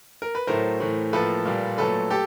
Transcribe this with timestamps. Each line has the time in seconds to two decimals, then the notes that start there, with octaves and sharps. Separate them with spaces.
0.22 A#4
0.35 B4
0.47 A2 F#3 A3 A#4 C5
0.80 A2 E3 A3
1.13 A2 F3 A#3 A4 B4
1.45 A#2 G3 A#3
1.78 A#2 F#3 A3 A4 B4
2.10 G4 A4